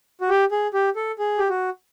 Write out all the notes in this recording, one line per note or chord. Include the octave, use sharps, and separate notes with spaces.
F#4
G4
G#4
G4
A4
G#4
G4
F#4